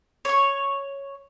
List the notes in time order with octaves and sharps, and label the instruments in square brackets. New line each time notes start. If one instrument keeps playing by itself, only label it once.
[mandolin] C#5 C#6